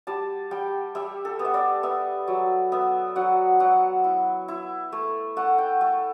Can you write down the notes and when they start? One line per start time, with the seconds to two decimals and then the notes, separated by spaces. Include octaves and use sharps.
0.07 G3 A5
0.51 G3 G5
0.95 G3 E5
1.25 A4
1.39 B3
1.45 E5
1.54 D5
1.83 B3 E5
2.27 F#3
2.72 B3 E5
3.16 F#3 F#5
3.60 F#3 F#5
4.04 E4
4.48 E4
4.92 A3
5.36 A3 F#5
5.58 G5
5.81 A3